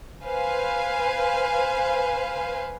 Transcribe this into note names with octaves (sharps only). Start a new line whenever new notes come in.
B4 C5 F5 G#5